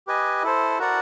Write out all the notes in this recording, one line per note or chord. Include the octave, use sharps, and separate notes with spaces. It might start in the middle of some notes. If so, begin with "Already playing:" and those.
G4 B4 D#5 G#5
E4 A4 C5
F#4 A#4 D5 F#5